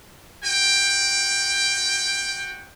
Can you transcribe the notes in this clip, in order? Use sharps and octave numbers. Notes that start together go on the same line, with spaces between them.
F#4 G5